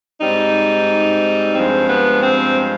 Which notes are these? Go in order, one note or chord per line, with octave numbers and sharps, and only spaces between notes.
G#2 G3 C4 D#4
G2 F3 G#3 C4
B3
C4